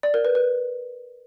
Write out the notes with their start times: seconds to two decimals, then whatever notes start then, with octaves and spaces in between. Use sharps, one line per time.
0.03 D5
0.14 A#4
0.25 B4
0.35 B4